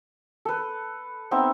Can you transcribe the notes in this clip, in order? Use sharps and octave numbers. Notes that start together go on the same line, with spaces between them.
A4 B4
B3 C4 D#4 E5